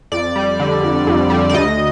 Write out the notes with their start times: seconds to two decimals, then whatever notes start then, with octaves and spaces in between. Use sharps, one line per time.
0.12 F2 D5
0.36 G3
0.60 D3
0.83 F2
1.07 F2
1.30 G3
1.49 D5
1.54 D2 D#5